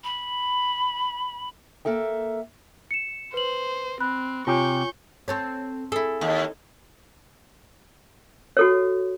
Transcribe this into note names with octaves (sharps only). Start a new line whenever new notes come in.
B5
A#3 A4 E5 G5
C#7 E7
B4 C5 F#7
C4 B5 F#6
C3 F4 G4 C#5 G#5 C#6 G6
C4 A4 C#5
E4 G#4 A4
D#2
F#4 A4 C#5